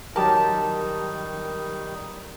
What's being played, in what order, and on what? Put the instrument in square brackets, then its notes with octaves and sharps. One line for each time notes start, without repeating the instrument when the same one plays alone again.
[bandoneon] D#3 G3 D#4 [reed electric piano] F#3 G4 A#4 [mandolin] A5